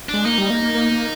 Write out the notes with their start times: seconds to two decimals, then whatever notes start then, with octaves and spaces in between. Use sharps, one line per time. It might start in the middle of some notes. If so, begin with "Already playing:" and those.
0.09 G#3 D4
0.25 A#3 D#4
0.38 G3
0.50 A#3
0.62 A#3
0.75 A#3
0.91 A#3